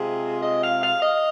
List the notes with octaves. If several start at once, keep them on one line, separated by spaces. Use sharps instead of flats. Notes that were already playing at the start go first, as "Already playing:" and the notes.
Already playing: C3 G#3 C4 F4 G#4
D#5
F5
F5
D#5